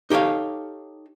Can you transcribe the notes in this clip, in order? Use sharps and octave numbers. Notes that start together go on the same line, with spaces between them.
D#4 G4 A4 C#5 F5